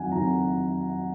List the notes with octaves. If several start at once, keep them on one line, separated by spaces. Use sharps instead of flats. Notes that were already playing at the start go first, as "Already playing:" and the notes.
Already playing: F2 D#3 F#3 F#5 G#5
F2 D#3 F#3 A#5